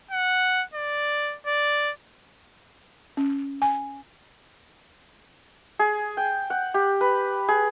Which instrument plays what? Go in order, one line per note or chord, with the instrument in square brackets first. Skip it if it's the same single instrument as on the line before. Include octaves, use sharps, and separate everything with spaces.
[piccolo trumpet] F#5
D5
D5
[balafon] C#4
G#5
[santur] G#4
G5
F#5
G4
B4
G#4